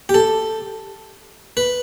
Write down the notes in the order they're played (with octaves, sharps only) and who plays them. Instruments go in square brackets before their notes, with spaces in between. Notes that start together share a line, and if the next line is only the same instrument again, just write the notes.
[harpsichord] G4
A4
B4